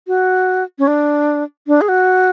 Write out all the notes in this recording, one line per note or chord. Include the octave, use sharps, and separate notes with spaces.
F#4
C#4
D4
D4
G#4
F#4